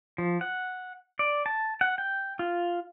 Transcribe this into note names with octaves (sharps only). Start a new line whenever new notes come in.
F3
F#5
D5
A5
F#5
G5
F4